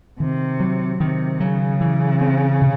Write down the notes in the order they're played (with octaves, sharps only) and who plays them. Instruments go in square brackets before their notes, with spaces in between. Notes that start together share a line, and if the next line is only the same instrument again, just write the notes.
[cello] C3 [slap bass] D#3
[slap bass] F#3
[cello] C3 [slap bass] D#3
[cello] C#3 [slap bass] F#3
[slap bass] E3
C4
C3